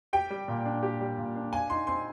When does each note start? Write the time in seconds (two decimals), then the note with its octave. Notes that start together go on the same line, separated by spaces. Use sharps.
0.13 G4 G5
0.30 G3
0.48 A#2
0.66 D4
0.83 G4
1.01 G3
1.18 A#2
1.36 D4
1.52 F5 G#5
1.70 D#4 C6
1.87 C4 C6